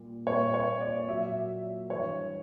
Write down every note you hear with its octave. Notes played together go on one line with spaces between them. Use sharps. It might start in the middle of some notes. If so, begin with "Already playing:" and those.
Already playing: A#2 G3
A#2 G3 C#5
C#5
D5
A#2 F#3 E5
G2 E3 G3 C#5